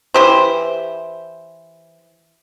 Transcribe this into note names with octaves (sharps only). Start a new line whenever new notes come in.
E3 G4 C5